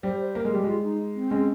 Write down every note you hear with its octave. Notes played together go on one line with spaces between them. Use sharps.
G3 C5
C5
A#3 A#4
G#3
G3 G4
G#3 F4
D#4
C4
G#3 C4 C#4